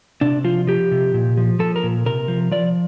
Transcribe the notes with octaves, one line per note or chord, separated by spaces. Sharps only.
C3 D4
F3 F4
F3 G4
C3
A#2
F3
F3 A4
A#4
A#2
C3 A#4
F3
F3 D5